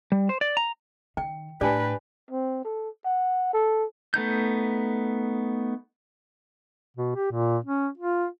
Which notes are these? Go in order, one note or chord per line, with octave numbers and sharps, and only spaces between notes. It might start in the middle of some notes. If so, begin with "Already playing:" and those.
G3
C5
D5
A#5
D#3 G5
A2 D4 G4 B4 D5 G#5
C4
A4
F#5
A4
A3 B3 D#4 G6
B2
G4
A#2
C#4
F4